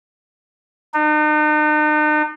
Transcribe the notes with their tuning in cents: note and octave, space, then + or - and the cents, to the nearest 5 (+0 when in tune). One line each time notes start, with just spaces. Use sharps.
D#4 -45